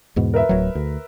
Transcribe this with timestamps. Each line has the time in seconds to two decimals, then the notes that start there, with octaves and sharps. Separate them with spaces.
0.16 E2 G#2 B2
0.34 A#4 B4 E5
0.49 D1 F#3
0.75 D2